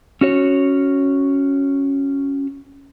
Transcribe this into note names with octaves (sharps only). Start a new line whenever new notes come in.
C#4 F#4 C#5